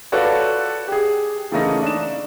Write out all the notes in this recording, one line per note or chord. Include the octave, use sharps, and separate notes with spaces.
F4 F#4 A4 B4 C#5 D5
G4 G#4
C#3 E3 A3 A#3 C#4 D#4
D4 E7